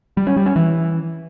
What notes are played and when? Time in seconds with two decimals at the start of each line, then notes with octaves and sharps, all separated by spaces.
0.17 G3
0.27 C#4
0.36 G3
0.46 C#4
0.56 E3